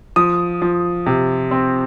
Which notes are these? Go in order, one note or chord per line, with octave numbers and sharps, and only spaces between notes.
F3 D#6
F3
C3
C4